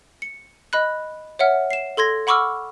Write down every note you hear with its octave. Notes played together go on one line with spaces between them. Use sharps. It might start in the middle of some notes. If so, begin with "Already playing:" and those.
C#7
D#5 B5 F#6
C#5 E5 F#5 F6
C7 E7
A4 C6 G#6 A#6
F#5 B5 C#6 D6 E6 F6